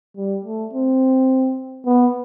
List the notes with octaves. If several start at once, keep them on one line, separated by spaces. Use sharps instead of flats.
G3
A3
C4
B3